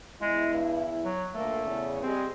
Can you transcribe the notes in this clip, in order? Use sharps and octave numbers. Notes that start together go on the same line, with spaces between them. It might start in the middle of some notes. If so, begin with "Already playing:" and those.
E2 G#3 E4
G2
F#3
D2 A#2 A3 A#3
E2 C#3
G3 G#3 C4